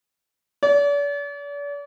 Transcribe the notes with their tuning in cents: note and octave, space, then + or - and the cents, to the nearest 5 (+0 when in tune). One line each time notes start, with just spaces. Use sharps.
D5 -40